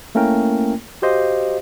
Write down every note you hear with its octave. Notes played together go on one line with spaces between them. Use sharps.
A3 A#3 C#4 E4 A#4 G5
F#4 G4 C5 D#5 F5